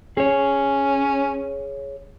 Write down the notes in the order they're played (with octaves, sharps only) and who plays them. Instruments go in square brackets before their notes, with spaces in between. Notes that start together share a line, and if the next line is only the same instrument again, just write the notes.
[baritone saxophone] C#4 [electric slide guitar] G#4 C#5